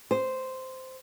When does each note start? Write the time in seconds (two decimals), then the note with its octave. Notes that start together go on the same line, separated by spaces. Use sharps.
0.11 C5